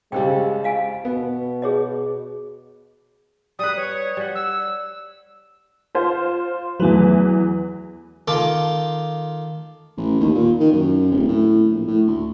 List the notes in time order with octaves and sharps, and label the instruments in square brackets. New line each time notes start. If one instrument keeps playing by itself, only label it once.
[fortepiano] C2 C#3 G3 [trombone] G#3 [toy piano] G5
[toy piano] D#5 F5 G#5
[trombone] B2 [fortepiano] B3
[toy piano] G#4 C#5 D#5
[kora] G3 B4 [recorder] D#6
[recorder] C#5
[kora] G3 F#5
[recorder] E6
[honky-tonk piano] F4 C5
[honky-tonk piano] E2 E3 B4 [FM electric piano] F#3 A3
[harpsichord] D#3 F4 A4 D6
[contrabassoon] A1
D#2
A#2
D#3
F#2
D1
A2
A#1
A2
D2